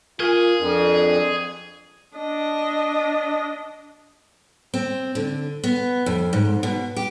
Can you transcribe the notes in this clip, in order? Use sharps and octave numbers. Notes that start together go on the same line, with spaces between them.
F4 G#4 A#4 G#5
F2 D4
D4 D#5
C4
D3
B3
F2
G#2
B2
G4